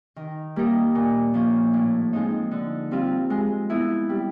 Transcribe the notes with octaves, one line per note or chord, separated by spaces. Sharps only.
D#3
G3 A#3 D#4
A#2
F3 A#3 C#4
A2
F3 G#3 C4 D#4
D3
G3 C4 F4
G#3
B3 E4
G3